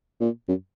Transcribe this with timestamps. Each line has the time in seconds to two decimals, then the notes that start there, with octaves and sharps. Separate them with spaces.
0.21 A#2
0.49 F#2